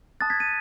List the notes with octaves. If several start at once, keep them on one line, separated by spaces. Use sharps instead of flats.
A5 D#6 F#6 A6
G#6 B6
B6 D#7